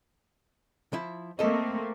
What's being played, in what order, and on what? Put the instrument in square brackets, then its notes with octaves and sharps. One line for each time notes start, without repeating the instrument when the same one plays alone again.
[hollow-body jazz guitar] F3 E4
[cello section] A3 A#3 C4 [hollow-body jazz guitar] A4 D#5